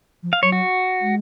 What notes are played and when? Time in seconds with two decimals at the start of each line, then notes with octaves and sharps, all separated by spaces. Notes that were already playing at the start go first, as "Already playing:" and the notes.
0.23 F3
0.33 F5
0.42 F#3 C#5
0.52 F#4
1.01 G#3